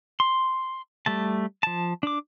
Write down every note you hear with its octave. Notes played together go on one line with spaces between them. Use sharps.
C6
G3 A3 A5
F3 A5
D4 D6